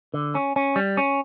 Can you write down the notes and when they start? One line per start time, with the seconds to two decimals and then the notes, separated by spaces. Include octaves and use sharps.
0.14 D3
0.35 C#4
0.56 C#4
0.76 G3
0.97 C#4